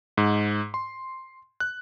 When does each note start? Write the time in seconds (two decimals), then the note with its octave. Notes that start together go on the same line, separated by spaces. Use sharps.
0.17 G#2
0.74 C6
1.60 F#6